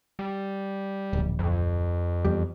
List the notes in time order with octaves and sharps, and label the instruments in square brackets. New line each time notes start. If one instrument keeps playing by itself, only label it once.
[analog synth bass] G3
[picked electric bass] D1 A#1
[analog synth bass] F2
[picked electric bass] E2 G3